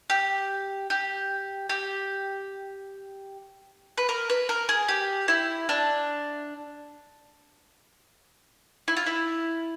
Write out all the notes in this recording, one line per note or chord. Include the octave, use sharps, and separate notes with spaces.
G4
G4
G4
B4
A#4
B4
A#4
G#4
G4
E4
D4
E4
F4
E4